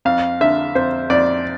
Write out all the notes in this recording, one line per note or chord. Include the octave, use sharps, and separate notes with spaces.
F2 F5
D3 E5
F2 C5
F2 D5